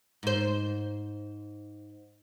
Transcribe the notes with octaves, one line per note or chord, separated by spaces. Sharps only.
G#2 C5